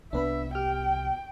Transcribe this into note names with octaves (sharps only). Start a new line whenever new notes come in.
C2 B3 D4 B4 E5 B5
G4 G5 F6